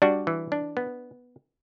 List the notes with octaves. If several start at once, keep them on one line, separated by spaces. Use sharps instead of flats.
G3 D4 F#4
E3
D4
B3